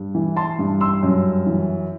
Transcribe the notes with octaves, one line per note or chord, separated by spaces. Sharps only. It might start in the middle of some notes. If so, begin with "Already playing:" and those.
Already playing: G2
E3
A5 C6
G2
C6 E6
F#2
E3